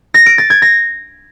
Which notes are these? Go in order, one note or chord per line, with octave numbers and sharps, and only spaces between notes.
A#6
D7
A6
G#6
A#6